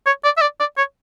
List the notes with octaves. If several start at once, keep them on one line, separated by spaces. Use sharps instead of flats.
C#5
D5
E5
D5
D5
C#5